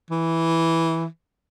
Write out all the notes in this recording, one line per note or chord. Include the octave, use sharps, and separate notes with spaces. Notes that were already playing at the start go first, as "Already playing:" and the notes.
E3